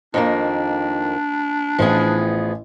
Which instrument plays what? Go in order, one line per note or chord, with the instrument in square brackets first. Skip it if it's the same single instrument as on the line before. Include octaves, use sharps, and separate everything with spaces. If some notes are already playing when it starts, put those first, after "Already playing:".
[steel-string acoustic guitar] F2 D#3 A#3 [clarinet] D4
[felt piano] A1 A2 [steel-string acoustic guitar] F3 B3 G#4